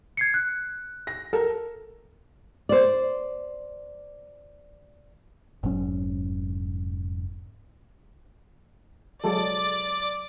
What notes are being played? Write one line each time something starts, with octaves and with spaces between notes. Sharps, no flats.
G#6 C7 C#7
F#6
A#6
A4 A#4
C5 D5
F1 G#2 F#3 C#4
F#3 G#3 A4 D5